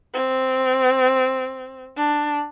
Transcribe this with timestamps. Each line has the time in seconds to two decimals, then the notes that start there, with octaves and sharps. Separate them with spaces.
0.13 C4
1.97 D4